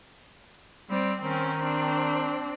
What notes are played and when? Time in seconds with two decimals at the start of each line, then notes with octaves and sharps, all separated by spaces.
0.90 G3 C4
1.22 D#3 C4 C#4
1.60 C4 D4